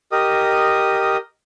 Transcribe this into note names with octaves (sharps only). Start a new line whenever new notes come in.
G4 A#4 D#5 D#6